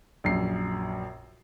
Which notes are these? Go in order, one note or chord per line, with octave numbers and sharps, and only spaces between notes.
A#1 F#2 C7